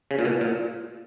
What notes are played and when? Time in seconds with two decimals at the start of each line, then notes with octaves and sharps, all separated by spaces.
0.11 C#3
0.19 A#2
0.25 B2
0.41 A#2